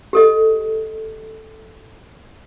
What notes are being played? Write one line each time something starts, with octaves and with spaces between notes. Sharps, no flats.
G4 A4 D#5